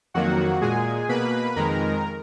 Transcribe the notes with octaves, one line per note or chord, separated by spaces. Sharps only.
F2 D#3 F#3 A#3 F#4 F#5
A#2 G#3 G#4 G#5
B2 A#3 B4 B5
F2 D#3 G#3 A#4 A#5